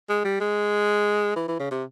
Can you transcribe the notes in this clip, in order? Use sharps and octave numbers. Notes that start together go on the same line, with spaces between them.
G#3
G3
G#3
E3
E3
C#3
C3